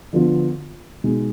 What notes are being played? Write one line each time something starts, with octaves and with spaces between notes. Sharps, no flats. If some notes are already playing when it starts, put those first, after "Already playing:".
D3 F3 B3 F4
B2 G#3 D#4